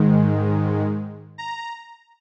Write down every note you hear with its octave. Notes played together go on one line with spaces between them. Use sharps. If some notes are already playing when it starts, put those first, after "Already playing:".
Already playing: G#2 D#3 G#3
A#5